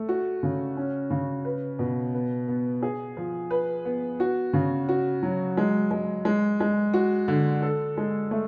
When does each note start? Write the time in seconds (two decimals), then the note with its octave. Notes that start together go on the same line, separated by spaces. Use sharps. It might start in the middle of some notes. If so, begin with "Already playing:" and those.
Already playing: A3
0.09 F#4
0.43 C#3
0.77 C#4
1.10 C#3
1.45 B4
1.79 B2
2.14 B3
2.48 B3
2.83 G#4
3.17 F3
3.51 B4
3.85 B3
4.20 F#4
4.53 C#3
4.89 F#4
5.23 F#3
5.57 G#3
5.91 G#3
6.25 G#3
6.60 G#3
6.94 F#4
7.28 D3
7.62 A4
7.97 G#3
8.31 A3